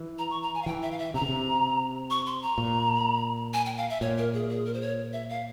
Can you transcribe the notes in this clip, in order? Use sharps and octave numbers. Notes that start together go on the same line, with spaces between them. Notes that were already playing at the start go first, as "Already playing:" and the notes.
Already playing: E3
A#5
C#6
A#5
G#5
F5
E3 G5
E5
F5
E5
C3 A#5
C#3
C3
C#6
C6
A#5
A#2
G#5
G5
F5
E5
A#2 C#5
A#4
G#4
G#4
A#4
C5
C#5
E5
F5